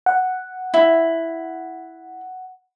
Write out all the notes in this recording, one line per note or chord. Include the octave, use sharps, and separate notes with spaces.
F#5
E4